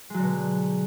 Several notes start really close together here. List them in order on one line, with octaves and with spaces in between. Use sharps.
G#3 F#3 D3 B2